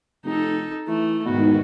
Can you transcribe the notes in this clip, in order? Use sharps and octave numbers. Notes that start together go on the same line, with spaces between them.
F1 D#4 A4
E3 A3
E2 G#2 B2 D#3 F#4